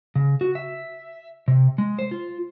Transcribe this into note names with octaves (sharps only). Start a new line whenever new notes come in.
C#3
F#4
E5
C3
G#3
C5
F4